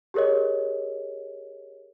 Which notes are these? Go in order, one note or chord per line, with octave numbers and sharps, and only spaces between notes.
G4 G#4 A#4 C#5 D#5